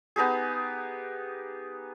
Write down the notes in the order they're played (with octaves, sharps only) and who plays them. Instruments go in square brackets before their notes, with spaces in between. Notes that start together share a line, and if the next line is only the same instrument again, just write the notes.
[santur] B3 D#4 G4 G#4